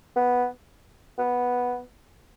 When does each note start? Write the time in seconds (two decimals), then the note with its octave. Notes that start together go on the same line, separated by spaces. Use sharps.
0.16 B3
1.19 B3